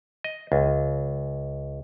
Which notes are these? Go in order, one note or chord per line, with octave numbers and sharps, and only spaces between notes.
D#5
C#2